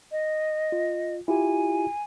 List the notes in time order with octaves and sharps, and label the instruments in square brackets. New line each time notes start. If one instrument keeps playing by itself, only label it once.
[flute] D#5
[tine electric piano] F4
[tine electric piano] E4 F4 G4 [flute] G#5